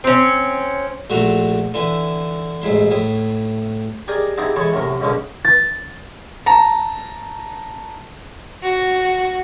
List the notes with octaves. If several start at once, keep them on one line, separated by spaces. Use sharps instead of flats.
C4 C#4
A#1 A3 F#4 A4 A#5 C6
D3 E3 E4
A1 G#2 E4 C6
A2 E4 D#6
G4 G#4 A#4 D5 D#5
B3 C4 D#4 E4 G4 G#4
E3 G#3 E4 A4 C#5
F#2 A2 C3 A#4
C#2 F#2 B2 D3 G#3 C#4
A6
A5 A#5
F#4